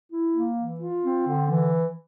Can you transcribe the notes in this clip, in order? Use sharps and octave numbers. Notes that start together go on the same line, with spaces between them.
E4
A#3
E3
F4
C4
D3
E3